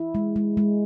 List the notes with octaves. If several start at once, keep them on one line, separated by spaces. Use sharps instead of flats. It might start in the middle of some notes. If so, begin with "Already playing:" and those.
Already playing: E4
G#3
G#3
G#3